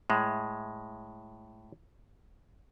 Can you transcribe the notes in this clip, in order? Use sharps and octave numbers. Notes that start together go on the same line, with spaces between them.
A2 G#3